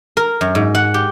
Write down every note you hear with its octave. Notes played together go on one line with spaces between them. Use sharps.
A#4
F#2
G#2
F#5
G4